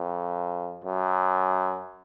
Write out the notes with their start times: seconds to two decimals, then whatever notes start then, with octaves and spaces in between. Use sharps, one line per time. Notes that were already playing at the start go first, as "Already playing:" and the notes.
Already playing: F2
0.84 F#2